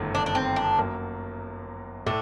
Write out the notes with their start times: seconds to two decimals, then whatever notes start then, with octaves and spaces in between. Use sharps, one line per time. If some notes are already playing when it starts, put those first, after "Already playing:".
Already playing: G1 F#2 D#3 A3
0.15 D4
0.26 D4
0.35 C4
0.56 D4
0.78 F#2 F#3 A#3
2.06 A2 A3 D4